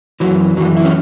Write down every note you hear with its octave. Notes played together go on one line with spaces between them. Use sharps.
F#2 E3 F#3
F#2 E3 F#3
E4
C#4